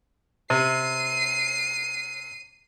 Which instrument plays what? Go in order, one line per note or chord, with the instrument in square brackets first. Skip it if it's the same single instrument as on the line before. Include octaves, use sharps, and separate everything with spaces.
[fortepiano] C3 [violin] C7 D#7